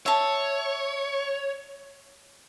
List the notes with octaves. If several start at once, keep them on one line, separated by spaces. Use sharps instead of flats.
C#5 E5 A5